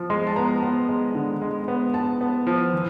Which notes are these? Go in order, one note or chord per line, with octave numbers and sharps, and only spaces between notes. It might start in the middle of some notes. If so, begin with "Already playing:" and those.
Already playing: F3
G#3 C6
A5
B3 A#5
B3
G#3
D3
G#3
B3
B3 A5
B3
F3
E3